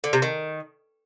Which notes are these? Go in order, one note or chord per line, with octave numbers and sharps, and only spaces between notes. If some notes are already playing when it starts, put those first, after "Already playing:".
D3
C3
D#3